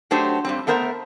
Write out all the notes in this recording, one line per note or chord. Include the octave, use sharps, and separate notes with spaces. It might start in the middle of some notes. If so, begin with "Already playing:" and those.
F#3 A3 D4 G4 C5
G2 G3 C4
A3 B3 A#4 C5 E5